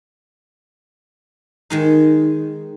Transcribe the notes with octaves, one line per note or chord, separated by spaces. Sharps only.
D#3 G#3 D#4